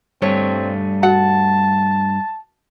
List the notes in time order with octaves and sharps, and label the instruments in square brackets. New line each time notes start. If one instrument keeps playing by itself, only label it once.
[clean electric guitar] G2 G3 A3 [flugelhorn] C4 [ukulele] C#5
[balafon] F#4 [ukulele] F#5 [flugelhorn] A5